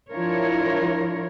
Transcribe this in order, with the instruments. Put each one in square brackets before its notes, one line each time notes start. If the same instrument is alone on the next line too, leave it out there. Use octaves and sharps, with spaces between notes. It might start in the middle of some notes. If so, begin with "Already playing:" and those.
[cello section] F3 D4 E4 F4 A#4 C#5